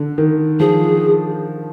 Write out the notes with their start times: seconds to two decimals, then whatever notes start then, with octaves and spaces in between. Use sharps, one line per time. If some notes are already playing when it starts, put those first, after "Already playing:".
Already playing: D3
0.18 D#3
0.60 F3 G#4